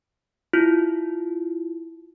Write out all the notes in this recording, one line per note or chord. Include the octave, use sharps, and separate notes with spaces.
E4 F4